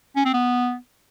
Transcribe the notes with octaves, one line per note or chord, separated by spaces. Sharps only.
C#4
C4
B3